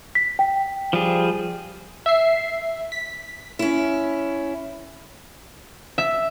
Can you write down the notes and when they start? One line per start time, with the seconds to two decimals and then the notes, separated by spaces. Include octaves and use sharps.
0.15 B6
0.39 G5
0.93 F3 G3 G#4
2.06 E5 C7
2.92 B6
3.59 C#4 E4
5.98 E5